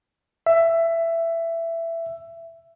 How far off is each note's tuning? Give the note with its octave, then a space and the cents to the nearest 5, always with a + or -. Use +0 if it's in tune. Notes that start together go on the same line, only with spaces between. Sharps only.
E5 +15